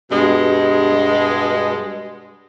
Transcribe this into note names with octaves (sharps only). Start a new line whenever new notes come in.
G2 B2 G#3